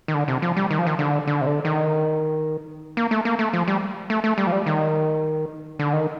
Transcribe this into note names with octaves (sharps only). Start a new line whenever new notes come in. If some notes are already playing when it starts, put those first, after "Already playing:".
D#3
D3
C3
F3
G3
D#3
F3
D#3
D3
D3
C3
D3
D#3
A#3
A3
A#3
A3
F3
G3
A3
A3
G3
F3
G3
D#3
D3
D#3